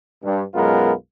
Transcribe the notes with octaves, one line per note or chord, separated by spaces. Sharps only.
G2
B1 F#2 G#3 B3 F4 A#4